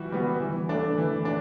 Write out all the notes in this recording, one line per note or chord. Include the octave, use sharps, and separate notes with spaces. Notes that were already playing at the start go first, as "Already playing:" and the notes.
Already playing: E3 G3 F#4
G3 B3 F#4
E3
A3 D4
E3
D4